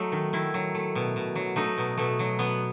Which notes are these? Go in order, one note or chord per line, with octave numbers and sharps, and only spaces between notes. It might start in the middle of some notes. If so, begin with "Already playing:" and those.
Already playing: F#3 A3 D#4
D#3
D#3 E4
F#3
A3
B2
B2
F#3
A3 D#4
B2
B2 A3
F#3
B2 B3